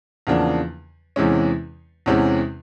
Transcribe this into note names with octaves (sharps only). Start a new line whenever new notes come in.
E2 C#3 F3 A#3 D4
E2 C3 E3 G#3 C#4
E2 C3 E3 G#3 C#4